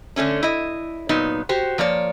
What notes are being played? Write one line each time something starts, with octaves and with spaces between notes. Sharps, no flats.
D3 A3 C#4 D4
E4 D#5
A#2 F#3 B3 D#4
F#4 G4 C5
F3 A#3 C#5 D5